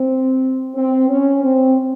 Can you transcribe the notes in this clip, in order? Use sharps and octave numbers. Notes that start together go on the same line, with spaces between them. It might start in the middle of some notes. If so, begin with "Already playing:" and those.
Already playing: C4
C4
C#4
C4